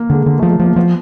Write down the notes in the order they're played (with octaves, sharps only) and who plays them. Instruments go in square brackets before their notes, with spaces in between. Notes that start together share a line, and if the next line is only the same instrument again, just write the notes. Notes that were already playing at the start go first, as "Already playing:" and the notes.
Already playing: [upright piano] A#3
[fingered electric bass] D3 [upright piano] G#3
[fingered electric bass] D3 [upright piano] G#3
[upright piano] A3
[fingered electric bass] F3
[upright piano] A3
[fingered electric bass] F3 [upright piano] A#3
[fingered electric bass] F3 [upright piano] B3